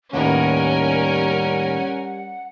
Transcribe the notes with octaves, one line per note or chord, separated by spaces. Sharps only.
D#2 A2 G3 C#4 A#4 B4 F#5 G#5